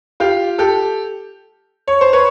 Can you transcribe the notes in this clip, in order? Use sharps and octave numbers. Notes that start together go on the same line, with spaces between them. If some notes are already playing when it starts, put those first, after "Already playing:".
F4 G4
G4 A4
C#5
C5
B4 C#5